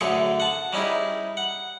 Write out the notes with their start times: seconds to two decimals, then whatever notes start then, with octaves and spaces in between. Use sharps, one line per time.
0.01 F#2 A2 D3 G#4 A4 C#6
0.40 F#5 A5
0.73 G3 C#4 D#4 E4 G#4
1.37 F#5